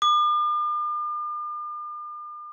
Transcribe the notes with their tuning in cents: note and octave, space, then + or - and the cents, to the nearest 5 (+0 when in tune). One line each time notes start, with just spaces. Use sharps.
D6 +45